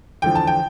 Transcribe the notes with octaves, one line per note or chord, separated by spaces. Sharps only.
E2 D3 F3 G5
A5
G5